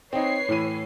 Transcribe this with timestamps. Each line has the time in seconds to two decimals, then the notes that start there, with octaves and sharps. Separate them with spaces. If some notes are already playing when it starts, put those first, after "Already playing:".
0.13 C4 D#4 B4 C#5 C7
0.49 A2 E3 D#7